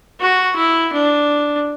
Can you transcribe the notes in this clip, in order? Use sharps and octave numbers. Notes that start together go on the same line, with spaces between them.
F#4
E4
D4